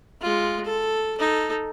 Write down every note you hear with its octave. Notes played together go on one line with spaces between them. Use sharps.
G#3 F4
A4
D#4 A4